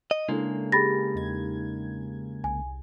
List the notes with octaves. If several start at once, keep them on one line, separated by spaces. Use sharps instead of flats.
D#5
C#3 G#3 A#3 D4 E4 A4
G4 G#4 B5 A6 A#6
E2 D#4 G#6
C2 G#5